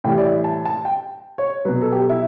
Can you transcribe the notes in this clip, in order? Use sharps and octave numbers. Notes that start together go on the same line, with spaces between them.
A2 E3 G3 G5
D5
E5
A5
A5
G5
C#5
B2 F#3 B4
A4
G4
E4